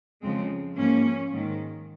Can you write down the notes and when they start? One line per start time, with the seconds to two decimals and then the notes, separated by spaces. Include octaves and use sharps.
0.22 F2 C#3 F3 G#3 C4
0.76 G#2 F3 A#3 C#4
1.31 G#2 D#3